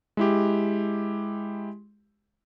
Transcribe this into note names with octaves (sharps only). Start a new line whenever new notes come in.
G#3 E4 G4